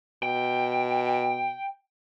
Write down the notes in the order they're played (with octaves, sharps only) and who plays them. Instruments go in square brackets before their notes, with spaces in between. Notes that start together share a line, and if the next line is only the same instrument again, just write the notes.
[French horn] B2 [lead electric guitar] G5